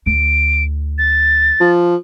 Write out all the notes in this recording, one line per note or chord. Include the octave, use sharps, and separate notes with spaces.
D2 D7
A6
F3